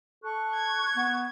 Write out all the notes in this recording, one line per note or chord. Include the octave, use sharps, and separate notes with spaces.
A4 C#6 F#6
G#6
B3